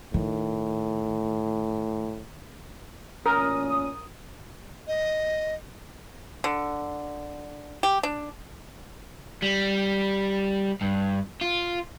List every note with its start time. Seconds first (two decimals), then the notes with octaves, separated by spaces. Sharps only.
0.14 A2 D#3
3.26 A1 A#2 C#4 A#4 D#6
4.88 D#5
6.44 D3
7.83 G4
8.03 D4
9.43 G3
10.81 G2
11.42 F4